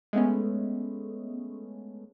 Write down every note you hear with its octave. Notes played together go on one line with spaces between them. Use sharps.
G#3 A3 B3 C#4